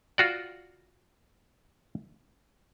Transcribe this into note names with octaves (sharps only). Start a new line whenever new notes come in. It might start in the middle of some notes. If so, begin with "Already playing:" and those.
F4 F#4 D5